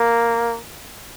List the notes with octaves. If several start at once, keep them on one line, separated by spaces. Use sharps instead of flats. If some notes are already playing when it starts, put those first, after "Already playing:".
Already playing: A#3